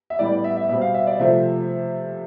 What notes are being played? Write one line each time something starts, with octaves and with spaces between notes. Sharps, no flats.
E5
A2 E3 G3 B3 D5
D5
E5
E5
B2 G3 C4 E5
F5
E5
D5
C3 F3 A3 C4 E5